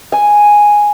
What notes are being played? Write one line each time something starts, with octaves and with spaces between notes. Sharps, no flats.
G#5